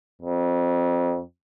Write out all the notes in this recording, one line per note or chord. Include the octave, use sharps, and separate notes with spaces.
F2